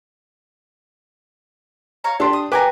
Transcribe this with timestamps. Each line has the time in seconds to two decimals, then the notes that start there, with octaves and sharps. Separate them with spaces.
2.04 C#5 F5 A#5
2.20 D4 G4 A4 C6
2.33 D#6
2.52 G4 B4 G#5 A#5 D6